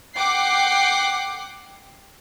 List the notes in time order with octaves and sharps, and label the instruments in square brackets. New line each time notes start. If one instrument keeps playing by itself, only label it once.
[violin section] F#5 G5 D6 C7